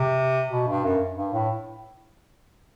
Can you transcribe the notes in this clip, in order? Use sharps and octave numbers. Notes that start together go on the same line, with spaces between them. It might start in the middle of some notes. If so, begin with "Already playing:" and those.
Already playing: C3
B2
G2
F#2
G2
A2